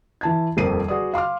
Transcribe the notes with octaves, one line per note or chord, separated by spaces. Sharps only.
E3 A5 G#6
D#1 F2 C4 A#4 C7 D#7
F#4 G#4 B4 D5 D#6
F5 C6 D6 F6